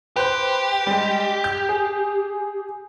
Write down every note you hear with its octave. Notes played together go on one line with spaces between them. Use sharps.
G4 B4 C5 F#6
G3 G#3
G6
G#4